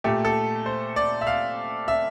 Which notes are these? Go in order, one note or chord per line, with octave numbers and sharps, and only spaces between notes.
A#2 A3 G4
A4
C5
D5
E5
F5
E5